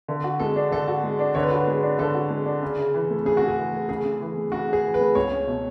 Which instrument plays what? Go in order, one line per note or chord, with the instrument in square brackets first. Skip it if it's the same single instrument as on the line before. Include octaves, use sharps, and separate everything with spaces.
[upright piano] D3
F#4
[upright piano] G#3 [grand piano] A4
[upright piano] D4
[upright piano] D3 [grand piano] A4
[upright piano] F#4
G#3
D4
[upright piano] D3 [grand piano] C#5
[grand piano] B4
[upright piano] F#4 [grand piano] A4
[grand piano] B4
[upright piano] G#3
D4
[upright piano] D3 [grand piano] A4
[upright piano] F#4
G#3
D4
C#3
C#3
E3
A3
[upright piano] C#3 [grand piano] G#4
[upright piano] C#3 [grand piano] F#4
[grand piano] G#4
[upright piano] E3
A3
[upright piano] C#3 [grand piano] G#4
[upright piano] C#3
E3
A3
[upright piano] C#3 [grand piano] F#4
[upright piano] C#3 [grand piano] G#4
[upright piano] E3
[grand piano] B4
[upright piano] A3
[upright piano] C#2 [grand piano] C#5
[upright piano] C#4
B2